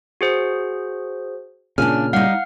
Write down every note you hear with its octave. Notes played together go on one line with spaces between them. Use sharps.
F#4 G#4 C5
A#2 C#3 D4 G#5 F6
G3 D#4 F5 F#5 F6